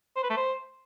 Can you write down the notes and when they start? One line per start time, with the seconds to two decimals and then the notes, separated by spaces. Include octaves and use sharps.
0.16 C5
0.23 B4
0.30 A3
0.37 C5